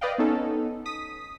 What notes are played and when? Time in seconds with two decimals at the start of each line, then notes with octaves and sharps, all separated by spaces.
0.01 B4 D5 D#5 F5 G5
0.18 B3 C#4 D#4 A4
0.86 D#6 B6